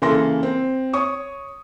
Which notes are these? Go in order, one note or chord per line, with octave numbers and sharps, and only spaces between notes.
C#3 E3 A#3 A4 C6 A#6
C4
C#5 C#6 D#6